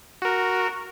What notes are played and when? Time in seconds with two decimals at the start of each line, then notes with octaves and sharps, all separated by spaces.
0.22 F#4 A#4